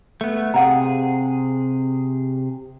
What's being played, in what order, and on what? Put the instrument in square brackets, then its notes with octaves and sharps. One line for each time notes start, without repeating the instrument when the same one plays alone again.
[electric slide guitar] A3 B3
[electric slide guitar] C3 G#4 [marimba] F5 F#5 A#5